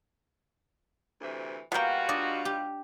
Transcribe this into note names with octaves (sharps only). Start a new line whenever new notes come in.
D2 C3 E3
B2 G3 A#3 F4 F#4 F5 G5
D4 D5 D#5
G4